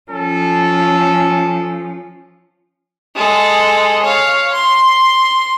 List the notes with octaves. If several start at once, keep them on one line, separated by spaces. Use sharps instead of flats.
F3 C#4 A4
G#3 A4
C#5 F5
C6